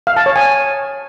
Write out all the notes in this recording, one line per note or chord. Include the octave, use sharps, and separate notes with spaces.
F5
A5
C#5
G#5